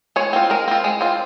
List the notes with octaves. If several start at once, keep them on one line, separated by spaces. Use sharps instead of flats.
G#3 C#5
C4 F4
G#3 A#4
C4 F4
G#3
C4 F4